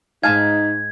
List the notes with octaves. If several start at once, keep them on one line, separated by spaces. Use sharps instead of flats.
G#2 D#4 F5 G#5 A5 G#6